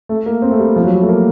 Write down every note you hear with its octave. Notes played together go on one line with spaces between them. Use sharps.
A3
A#3
C4
A3
G3
F3
F#3
G3
A3
A#3